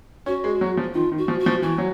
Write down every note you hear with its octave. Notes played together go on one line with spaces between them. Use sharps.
C#4 F#4
G#3
F#3
F3
D#3 F4
D#3
F#4
F3
F#4
F3
E3 F#4
F#3